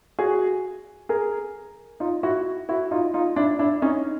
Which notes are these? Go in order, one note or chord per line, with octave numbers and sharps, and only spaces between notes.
F#4 G#4
G#4 A#4
D#4 F4
E4 F#4
E4 F#4
D#4 F4
D#4 F4
D4 E4
D4 E4
C#4 D#4